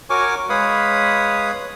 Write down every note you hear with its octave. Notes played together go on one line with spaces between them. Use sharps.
F#4 A#4 C#5 G#5 C#6 D6
G#3 B4 C#5 F5 B5 D#6